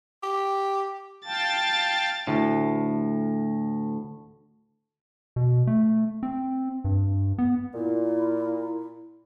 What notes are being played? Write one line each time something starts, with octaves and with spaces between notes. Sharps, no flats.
G4
F5 G5 A5 A6
D2 A2
B2
A3
C4
G2
B3
A#2 E4